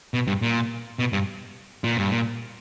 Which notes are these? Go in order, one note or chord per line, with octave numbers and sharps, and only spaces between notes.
B2
G2
A#2
B2
G2
A#2
G2
A#2